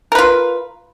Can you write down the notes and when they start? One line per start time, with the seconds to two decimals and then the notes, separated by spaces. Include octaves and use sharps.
0.12 A#4
0.15 B4
0.18 F4